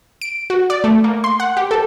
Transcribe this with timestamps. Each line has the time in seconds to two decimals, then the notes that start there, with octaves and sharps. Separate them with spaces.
0.22 D7
0.50 F#4
0.70 D5
0.84 A3
1.04 A#3
1.24 C6
1.40 F#5
1.57 G4
1.71 A4